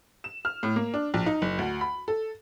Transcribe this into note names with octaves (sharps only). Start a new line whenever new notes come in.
E7
F6
A2
A#3
D4
A#1
D#4
F#1
D2
B5
A4